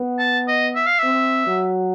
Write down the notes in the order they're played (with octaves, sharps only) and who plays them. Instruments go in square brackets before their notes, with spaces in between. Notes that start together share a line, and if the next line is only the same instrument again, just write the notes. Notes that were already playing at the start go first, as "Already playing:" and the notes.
Already playing: [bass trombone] B3
[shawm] A5
D#5
E5
F5
[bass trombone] C4 [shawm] E5
[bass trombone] F#3